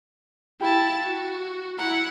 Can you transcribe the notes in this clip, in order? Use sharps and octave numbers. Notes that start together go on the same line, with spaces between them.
E4 G4 F5 A5 B5
F#4
E4 F#5 A#5